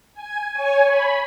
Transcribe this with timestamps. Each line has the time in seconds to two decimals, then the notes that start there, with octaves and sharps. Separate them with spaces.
0.14 G#5
0.50 C#5 G#5
0.86 B5